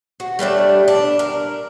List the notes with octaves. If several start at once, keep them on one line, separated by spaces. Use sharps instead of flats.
F#4
G3 A3 D4 D5
D4
A#4